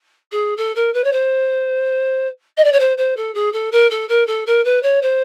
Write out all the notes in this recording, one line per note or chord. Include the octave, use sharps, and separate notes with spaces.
G#4
A4
A#4
B4
C#5
C5
D#5
D5
C#5
C5
C5
A4
G#4
A4
A#4
A4
A#4
A4
A#4
B4
C#5
C5